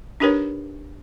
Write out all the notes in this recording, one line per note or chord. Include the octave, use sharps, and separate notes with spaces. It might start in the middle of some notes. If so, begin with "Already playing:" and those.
D4 D#4 G4 A#4 B4 C#5